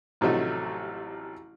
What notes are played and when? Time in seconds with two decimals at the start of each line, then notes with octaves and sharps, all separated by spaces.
0.21 A1 C3 F3 F#3 A3 D#4